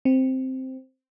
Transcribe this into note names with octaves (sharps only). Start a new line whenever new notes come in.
C4